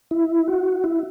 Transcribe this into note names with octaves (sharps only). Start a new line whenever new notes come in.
E4
F#4
E4